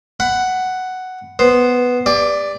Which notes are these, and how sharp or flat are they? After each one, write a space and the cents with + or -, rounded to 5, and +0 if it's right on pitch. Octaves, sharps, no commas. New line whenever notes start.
F#5 +5 B5 +20
B3 +0 C5 +0
G4 +40 D5 +0